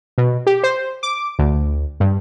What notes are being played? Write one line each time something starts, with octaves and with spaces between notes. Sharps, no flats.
B2
G4
C5
D6
D2
G2